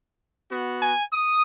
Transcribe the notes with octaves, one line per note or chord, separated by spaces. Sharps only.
B3 F#4
G#5
D#6